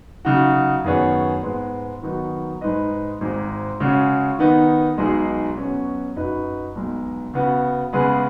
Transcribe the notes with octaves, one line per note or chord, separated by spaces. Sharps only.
C#3 F#3 D#4 F#4
F#2 D#3 B3 G#4 C#5
G#2 G#3 B3 G#4
D#3 F#3 B3 D#4
G#2 G#3 D#4 B4 D#5
G#1 G#2 G#3
C#3 G#3 C#4 F#4
D#3 B3 D#4
B1 B2 G#3 D#4 G#4
B2 F#3 C#4
F#2 F#3 D#4 B4 D#5
B1 B2 G#3
C#3 B3 F#4
C#3 G#3 B3 G#4 B4